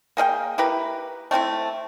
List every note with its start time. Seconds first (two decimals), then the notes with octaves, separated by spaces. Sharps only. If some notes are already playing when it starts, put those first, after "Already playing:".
0.17 A#3 G#4 E5 G5
0.58 E4 G4 A#4 B4
1.31 A3 C4 C#4 E4